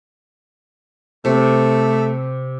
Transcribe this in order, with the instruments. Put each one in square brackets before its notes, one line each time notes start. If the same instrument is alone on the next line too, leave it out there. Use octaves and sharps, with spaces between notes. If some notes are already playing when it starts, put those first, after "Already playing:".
[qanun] C3 [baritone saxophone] A3